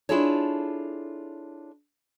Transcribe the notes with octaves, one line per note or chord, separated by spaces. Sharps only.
D4 E4 F4 G#4 A4 C#5